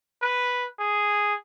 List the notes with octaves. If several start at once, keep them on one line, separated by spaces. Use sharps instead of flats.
B4
G#4